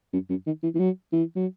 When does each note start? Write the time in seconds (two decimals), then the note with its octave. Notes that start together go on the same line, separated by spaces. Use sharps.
0.13 F#2
0.30 F#2
0.46 D#3
0.63 E3
0.75 E3
0.79 F#3
1.13 E3
1.35 F#3